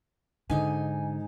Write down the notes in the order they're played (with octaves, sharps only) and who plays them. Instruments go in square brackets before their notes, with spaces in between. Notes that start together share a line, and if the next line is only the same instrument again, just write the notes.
[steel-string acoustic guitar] G#2 D#4 G#5 [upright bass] D3